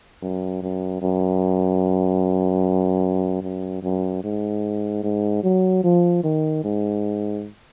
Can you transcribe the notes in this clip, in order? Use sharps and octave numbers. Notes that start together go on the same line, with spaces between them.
F#2
F#2
F#2
F#2
F#2
G#2
G#2
F#3
F3
D#3
G#2